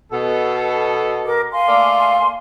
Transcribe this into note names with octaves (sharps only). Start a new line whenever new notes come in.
B2 A4
A#4 D6
F5 G#5 C6
A3 A#3 D5